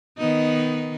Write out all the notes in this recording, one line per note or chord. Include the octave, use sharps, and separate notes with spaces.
D#3 B3 D#4